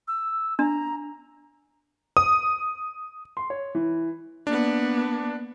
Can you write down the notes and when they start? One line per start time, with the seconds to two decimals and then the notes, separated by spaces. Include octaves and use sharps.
0.08 E6
0.59 D4 A#5
2.17 D#6
3.37 C6
3.50 C#5
3.75 E3
4.47 A#3 B3 D4